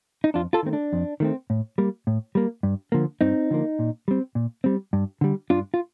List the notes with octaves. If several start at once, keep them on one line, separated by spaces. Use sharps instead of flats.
D#4
F2 D4 F4
F4 A4
D#3 A3 C4
D4
F2
D#3 A3 C4
A2
G3 A#3
A2
G3 A#3
G2
D3 F3 A#3
G2 C4 D#4
D3 F3 A#3
A#2
G3 C4
A#2
G3 C4
G2
D3 G3
G2 D4 F4
F4